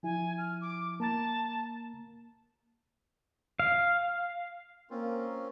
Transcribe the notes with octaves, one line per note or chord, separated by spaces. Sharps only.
F3 E4 G#5
F6
D6
A#3 A5 A#5 A6
F5
A#3 C4 C#4 F4